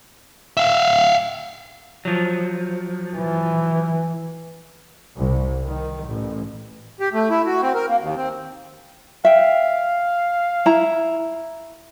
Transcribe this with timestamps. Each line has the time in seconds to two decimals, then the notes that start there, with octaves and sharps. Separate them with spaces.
0.57 E5 F5
2.05 F3 F#3
3.17 E3
5.16 C2
5.67 D#3
6.07 A1
7.00 G4
7.13 A3
7.30 E4
7.46 F#4
7.62 C4
7.75 A#4
7.89 A#3
8.00 D#2
8.17 C4
9.25 E5 F5 G5
10.66 E4 A#5